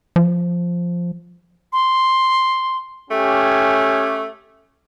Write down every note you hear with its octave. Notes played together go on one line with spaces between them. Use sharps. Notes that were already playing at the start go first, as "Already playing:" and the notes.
F3
C6
A3 C#4 G4